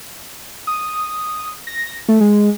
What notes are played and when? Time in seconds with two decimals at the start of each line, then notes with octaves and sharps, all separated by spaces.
0.67 D#6
1.67 A#6
2.08 A3
2.21 G#3